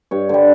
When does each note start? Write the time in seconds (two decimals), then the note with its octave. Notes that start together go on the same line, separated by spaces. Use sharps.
0.11 G2 C#5
0.29 D3 G3